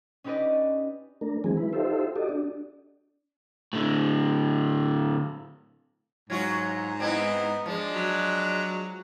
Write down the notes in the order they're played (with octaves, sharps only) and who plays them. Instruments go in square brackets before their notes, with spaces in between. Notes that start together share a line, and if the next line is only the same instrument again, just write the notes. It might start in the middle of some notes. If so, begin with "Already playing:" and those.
[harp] C#4 D#4 G4 B4 D5 D#5
[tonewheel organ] A3 D4 A#4
D#3 E3 F#3 G#3 C4 G#4
E4 B4
D#4 F4 G4 A4 C5 E5
F#4 G4 A4 D5 D#5
D4
[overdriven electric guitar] A2 D3
[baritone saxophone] G#2 [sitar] F#3 F4 F#4
[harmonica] B3 D#4 [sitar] C4 E4
[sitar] F3 [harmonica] G#3 D4
[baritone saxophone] F#3